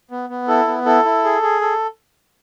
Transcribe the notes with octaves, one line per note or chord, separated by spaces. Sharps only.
B3
B3
E4 A4
B3
E4 A4
E4
G#4
G#4
A4